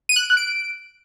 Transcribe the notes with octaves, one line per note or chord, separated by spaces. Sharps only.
D#7
F#6
D7
F#6
D7